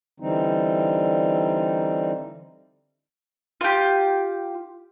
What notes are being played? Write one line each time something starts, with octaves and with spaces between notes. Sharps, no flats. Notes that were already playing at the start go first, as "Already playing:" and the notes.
D3 E3 G3 C4 D#4
F4 G4